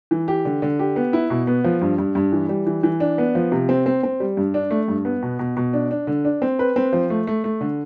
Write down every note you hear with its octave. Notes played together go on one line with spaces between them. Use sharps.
E3
G4
D3
D3
G4
B3
E4
B2
B3
F3
G2
G2
G2
E3
G3
E3
E3
D4
B3
F3
C3
C4
C4
C4
G3
G2
D4
A3
G2
B3
B2
B2
B2
D4
D4
D3
D4
C4
B4
C4
F3
A3
A3
A3
D3